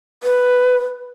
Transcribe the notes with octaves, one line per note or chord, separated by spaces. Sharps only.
B4